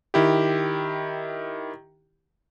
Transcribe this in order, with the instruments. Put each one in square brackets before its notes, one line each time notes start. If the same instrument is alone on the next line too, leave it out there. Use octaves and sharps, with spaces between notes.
[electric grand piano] D#3 E4 G4